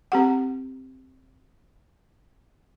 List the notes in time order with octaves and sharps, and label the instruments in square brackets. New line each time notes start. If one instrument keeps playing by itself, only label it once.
[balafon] C4 G4 F#5